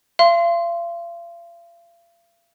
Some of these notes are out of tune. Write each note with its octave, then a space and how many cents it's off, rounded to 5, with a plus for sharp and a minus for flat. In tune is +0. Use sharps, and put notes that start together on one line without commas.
F5 -40 C6 +0